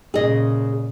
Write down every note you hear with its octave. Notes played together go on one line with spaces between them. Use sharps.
A#2 C#3 G#4 D#5